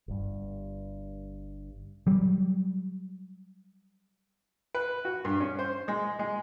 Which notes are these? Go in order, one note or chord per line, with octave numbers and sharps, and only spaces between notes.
G1 G2
F#3 G3
B4
F#4
G2
C#4
C5
G#3
G#3